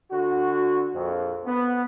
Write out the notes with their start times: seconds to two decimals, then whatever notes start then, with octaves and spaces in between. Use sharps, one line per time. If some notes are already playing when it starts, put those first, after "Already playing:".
0.11 D3 F#4
0.94 A#1 F2
1.46 B3